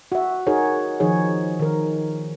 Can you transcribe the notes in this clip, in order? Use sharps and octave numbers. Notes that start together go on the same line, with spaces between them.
F#4 E5
D#4 F#4 G#4 A#4 C#5
D#3 F3 D#4 G#4 C#5
D#3 A#4